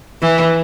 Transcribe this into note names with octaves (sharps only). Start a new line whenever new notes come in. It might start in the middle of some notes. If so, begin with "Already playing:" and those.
E3